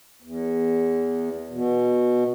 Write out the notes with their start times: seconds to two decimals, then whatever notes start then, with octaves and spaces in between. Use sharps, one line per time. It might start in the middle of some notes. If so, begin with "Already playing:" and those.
0.22 E2
1.50 B2